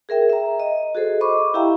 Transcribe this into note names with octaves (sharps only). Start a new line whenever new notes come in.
G#4 A#4 E5 G5
E5 A#5
D#5
F#4 G#4 A4 C5
D#5 B5 C#6 D6
E4 G4 E5 F5 G5 A#5